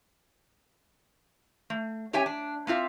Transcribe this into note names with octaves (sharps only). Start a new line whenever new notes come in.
A3
C#4 G4 C#5 E5 G5 G#5
D4
A#3 C4 F4 E5